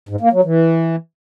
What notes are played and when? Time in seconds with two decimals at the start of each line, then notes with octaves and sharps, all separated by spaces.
0.09 G#2
0.21 A#3
0.33 F#3
0.44 E3